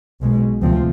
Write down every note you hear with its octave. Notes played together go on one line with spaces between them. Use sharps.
B1 B2 G#3
D2 C3 F3 C4